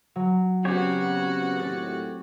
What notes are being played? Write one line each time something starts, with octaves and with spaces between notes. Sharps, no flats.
F#3
C#3 B3 C4 F#4 G4 C#5
D#2 A2 A6